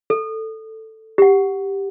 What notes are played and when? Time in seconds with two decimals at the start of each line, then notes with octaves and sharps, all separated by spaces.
0.10 A4
1.18 G4 F#5